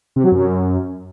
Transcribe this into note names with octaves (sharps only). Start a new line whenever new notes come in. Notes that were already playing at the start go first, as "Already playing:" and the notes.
C3
F#3
F#2